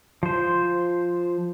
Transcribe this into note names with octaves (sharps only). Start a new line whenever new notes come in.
F3 C5